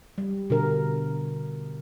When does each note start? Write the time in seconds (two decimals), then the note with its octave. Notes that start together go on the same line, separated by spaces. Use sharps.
0.18 G3
0.50 B2 D3 A#4